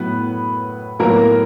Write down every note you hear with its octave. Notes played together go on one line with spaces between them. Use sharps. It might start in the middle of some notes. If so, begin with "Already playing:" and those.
Already playing: A2 F#3 B3 B4
A2 F#3 A#3 B3 A#4